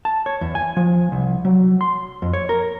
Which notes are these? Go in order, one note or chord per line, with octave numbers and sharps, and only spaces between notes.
A5
C#5
E2
G#5
F3
C2
F#3
C6
F2
C#5
A#4